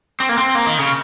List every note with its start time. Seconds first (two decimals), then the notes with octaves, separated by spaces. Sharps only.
0.20 C4
0.29 A#3
0.38 C4
0.55 A#3
0.67 D#3
0.79 C#3